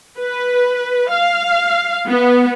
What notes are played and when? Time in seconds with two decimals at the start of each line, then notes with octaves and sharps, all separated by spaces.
0.18 B4
1.10 F5
2.07 B3